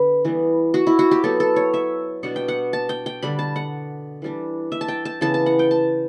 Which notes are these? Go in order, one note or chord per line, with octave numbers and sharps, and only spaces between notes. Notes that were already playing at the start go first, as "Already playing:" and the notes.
Already playing: D3 B3 B4
E3 G3 B3
F#4
E4
F#4
G4
F#3 B3 E4 A4
A4
C#5
E5
B2 G3 D4 F#5
G5
F#5
A5
G5
G5
D3 G3 D4 B5
A5
F#5
E3 G3 D4
E5
A5
G5
A5
C#3 E3 B3 A5
A5
F#5
G5
A5